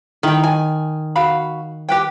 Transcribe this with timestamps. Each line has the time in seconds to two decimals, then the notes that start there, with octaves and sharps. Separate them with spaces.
0.23 D#3 E4 G5
0.44 G#5
1.16 F#4 F5 B5
1.89 G4 B4 G5